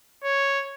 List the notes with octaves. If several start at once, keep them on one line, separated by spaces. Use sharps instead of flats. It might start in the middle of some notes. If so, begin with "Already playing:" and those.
C#5